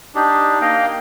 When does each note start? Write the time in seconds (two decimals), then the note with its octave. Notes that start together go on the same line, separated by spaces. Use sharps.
0.15 D4 D#4 G4
0.61 A#3 D#5 F5 G5